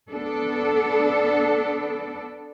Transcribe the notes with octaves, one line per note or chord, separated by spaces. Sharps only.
B3 D4 A4